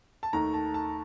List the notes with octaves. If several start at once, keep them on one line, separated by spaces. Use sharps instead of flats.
A5
D#2 D#3 A3 A#5
A5
A5